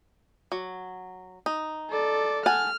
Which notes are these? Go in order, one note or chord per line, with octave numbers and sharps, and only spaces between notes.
F#3
D#4
A4 D5
F#5 G#5 A5 F6